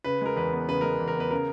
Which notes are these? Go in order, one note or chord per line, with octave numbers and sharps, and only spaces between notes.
C#3 B4
G#3 A#4
E2 B4
B3
C#3 B4
G#3 A#4
E2
A#4
B3 B4
C#3 A#4